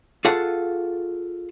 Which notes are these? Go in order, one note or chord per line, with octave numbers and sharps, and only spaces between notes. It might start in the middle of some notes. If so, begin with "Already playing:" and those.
F4 G#4 A4 F#5